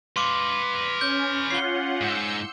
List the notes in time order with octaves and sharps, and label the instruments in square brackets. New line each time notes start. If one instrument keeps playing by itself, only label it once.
[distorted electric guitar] B4 F5 [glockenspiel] C6 D6
[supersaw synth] C#4 [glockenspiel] G6
[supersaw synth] C#4 F4 F#5 [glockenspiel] C7 G7
[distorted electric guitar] G#2 [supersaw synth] E6 G6 C#7